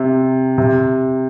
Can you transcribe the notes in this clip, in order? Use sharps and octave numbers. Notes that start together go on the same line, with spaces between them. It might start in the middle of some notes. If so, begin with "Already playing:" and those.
Already playing: C3
C3